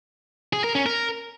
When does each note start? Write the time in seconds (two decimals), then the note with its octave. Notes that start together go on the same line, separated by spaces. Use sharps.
0.53 G#4
0.64 A#4
0.75 C#4
0.86 A#4